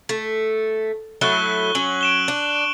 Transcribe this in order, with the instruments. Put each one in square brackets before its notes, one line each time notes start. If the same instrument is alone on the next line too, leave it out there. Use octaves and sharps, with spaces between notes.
[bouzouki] A3
[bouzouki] F#3 A3 E4 [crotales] C#6 F#6 G7
[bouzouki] F#3 C#4 [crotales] F#7
[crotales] D7 E7 G7
[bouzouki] D4